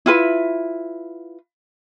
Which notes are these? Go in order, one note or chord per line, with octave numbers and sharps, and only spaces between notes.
E4 F4 B4